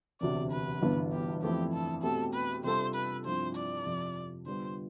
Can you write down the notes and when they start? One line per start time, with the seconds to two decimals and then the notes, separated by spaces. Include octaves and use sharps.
0.21 E1 D2 C3 D5
0.51 B4
0.82 G1 G2 E3 B3
1.12 G4
1.42 F2 E3 A3 C4 E4 G4
1.73 A4
2.03 B2 A3 C4 G4 A4
2.34 B4
2.64 C3 G3 D4 F4 A4 C5
2.95 B4
3.25 G2 F3 C4 E4 C5
3.56 D5
3.85 F2 C3 F3
4.46 D3 G3 B3 F4 C5